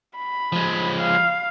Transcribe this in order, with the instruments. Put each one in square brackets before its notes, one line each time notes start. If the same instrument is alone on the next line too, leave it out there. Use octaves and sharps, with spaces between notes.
[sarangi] B5
[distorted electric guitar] F3 G#3
[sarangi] F5